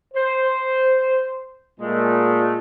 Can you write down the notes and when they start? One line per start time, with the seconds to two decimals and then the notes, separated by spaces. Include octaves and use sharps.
0.14 C5
1.80 A#2 G#3 A3